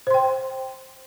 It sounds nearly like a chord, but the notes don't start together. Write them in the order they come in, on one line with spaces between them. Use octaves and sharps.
C5 C6 G5